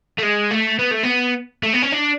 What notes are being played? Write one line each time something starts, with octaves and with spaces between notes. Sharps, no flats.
A3
G#3
A3
B3
A3
B3
A3
B3
C#4
D4